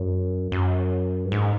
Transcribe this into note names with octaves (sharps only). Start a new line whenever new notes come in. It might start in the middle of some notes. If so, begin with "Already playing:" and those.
Already playing: F#2
F#2
G2
G#2